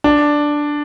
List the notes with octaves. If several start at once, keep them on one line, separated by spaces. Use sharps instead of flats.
D4